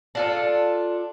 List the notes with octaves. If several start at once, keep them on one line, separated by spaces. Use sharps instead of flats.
D4 F4 A4